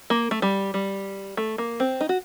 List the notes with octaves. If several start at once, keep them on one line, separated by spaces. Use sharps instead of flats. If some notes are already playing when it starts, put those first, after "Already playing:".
A#3
A3
G3
G3
A3
A#3
C4
D#4
F#4